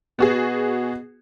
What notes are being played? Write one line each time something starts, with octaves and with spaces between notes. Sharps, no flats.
B2 B3 F#4 G#4